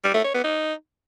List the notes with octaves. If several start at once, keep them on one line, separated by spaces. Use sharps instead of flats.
G3
A3
C#5
B3
D#4